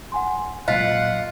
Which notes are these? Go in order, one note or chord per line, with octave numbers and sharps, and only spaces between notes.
F#5 G#5 C6
A#2 F#3 F4 D#5 F#5 B6